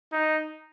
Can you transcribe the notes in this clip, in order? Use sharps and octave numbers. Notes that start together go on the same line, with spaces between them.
D#4